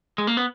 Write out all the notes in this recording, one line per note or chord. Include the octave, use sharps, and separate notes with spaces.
G#3
A#3
B3